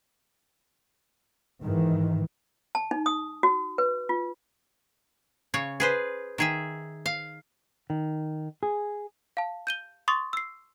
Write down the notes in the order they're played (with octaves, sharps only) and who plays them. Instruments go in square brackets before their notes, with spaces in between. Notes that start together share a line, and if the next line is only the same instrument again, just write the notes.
[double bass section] G#2 D#3 E3
[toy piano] A5
D#4
D#6
F#4
B4
F4
[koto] C#3 C#5
G#4 B4 C5
D#3 G#4 E5
F5
[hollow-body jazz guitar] D#3
G#4
[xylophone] F5 A5
G6 D#7 G7
C6 C#6 D#6 A6
E6 C7